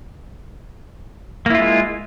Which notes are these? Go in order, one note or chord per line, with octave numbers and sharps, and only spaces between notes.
G#3 A#3 E4 F4